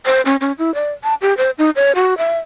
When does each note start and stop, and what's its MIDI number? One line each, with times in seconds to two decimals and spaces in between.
0.06 0.21 72
0.26 0.36 61
0.41 0.52 61
0.59 0.73 64
0.75 0.92 74
1.03 1.15 81
1.21 1.36 67
1.37 1.51 72
1.58 1.70 63
1.76 1.92 73
1.95 2.17 66
2.18 2.38 76